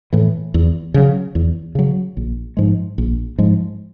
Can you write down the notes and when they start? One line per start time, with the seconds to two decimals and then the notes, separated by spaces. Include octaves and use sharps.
0.13 A2 E3
0.54 E2
0.94 C#3 F#3
1.35 E2
1.75 C#3 F#3
2.17 A#1
2.57 G#2 F3 G#3
2.98 A#1
3.38 G#2 F3 G#3